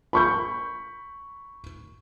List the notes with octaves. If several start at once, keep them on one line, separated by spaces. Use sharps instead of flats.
B5 C#6 G6